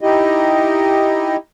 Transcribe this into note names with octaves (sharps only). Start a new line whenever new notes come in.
D#4 E4 G4 D#5